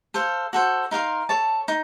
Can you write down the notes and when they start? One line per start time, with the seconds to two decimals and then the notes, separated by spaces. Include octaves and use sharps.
0.14 A4 C5 F5
0.53 F#4 A4 C5
0.91 D#4 A#4 F5 C6
1.29 A4 C#5 A5
1.68 D#4